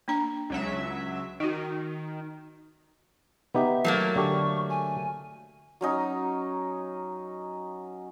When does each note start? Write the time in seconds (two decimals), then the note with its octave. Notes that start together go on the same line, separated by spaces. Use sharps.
0.08 A#3 D4 A#5
0.50 C#2 F#3 E5
1.40 D#3 D#4 F#4
3.55 B3 D#4 G4 E5
3.84 F#3 A3 A#3
4.16 D3 G4 A4 C#6
4.69 G#5
5.81 F#3 C#4 D#4